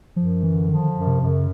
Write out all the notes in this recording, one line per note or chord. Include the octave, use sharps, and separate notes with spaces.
F#2 F3
D3 E3
D#3 F3
F#2
C3
F#2
C#3